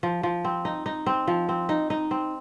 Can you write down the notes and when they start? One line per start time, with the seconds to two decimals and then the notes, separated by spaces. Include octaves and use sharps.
0.03 F3
0.23 F3
0.45 C4
0.65 D#4
0.86 D#4
1.06 C4
1.27 F3
1.49 C4
1.69 D#4
1.90 D#4
2.11 C4